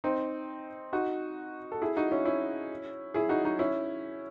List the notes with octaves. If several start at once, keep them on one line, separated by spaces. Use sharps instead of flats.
C4 D#4
D#4 F#4
A4
E4 G#4
D#4 F#4
C#4 E4
C#4 E4
E4 G#4
D#4 F#4
D#4 F#4
C#4 E4